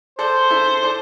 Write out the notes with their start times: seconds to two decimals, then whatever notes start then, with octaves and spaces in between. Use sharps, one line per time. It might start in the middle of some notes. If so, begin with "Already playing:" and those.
0.18 A4 C5 D5
0.50 E4 A4
0.83 A4 D5